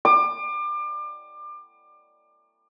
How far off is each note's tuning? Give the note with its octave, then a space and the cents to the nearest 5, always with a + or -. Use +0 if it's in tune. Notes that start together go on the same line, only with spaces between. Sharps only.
D6 +30